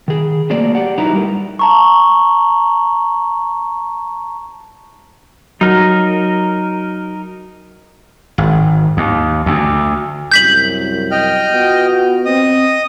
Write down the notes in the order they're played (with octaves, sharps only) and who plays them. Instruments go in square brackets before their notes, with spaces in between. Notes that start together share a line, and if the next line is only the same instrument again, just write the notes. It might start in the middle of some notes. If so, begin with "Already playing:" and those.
[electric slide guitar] D#3 G#4
F#3 A3 A#3 C5 D5
G4 D5 F#5
F#3 D#4 E4 B4 F#5 A#5
G3 A3 A#4
[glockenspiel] A5 A#5 C#6
[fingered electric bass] F#3 [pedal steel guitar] D#4 A#4
[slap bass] G#1
D#2
D2
[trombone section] C2 F#2 [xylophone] G6 B6 F#7
[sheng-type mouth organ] D#5 G5 F6
[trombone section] B3 F4 F#4
[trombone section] C4 [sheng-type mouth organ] D#5 D#6